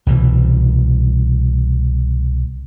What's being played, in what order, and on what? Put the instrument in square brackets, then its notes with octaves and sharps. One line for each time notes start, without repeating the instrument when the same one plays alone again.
[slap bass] C2 B2 E3